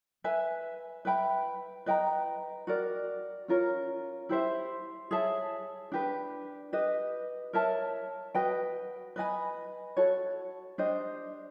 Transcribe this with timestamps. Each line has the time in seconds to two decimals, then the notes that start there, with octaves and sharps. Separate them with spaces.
0.24 B4 E5 G#5
1.05 B4 E5 G5 B5
1.86 B4 D#5 G5 A#5
2.67 F#4 A#4 D5
3.48 C#4 F4 A#4 C#5
4.29 E4 G4 C5 E5
5.11 G#4 C#5 E5 A5
5.92 D4 G4 B4
6.73 G4 B4 D#5
7.53 A#4 C#5 E5 A5
8.35 F#4 B4 D#5 G5
9.16 B4 D#5 G#5 B5
9.97 F#4 A4 C#5
10.78 D4 G4 C5 D#5